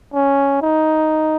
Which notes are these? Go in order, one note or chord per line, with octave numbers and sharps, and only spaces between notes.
C#4
D#4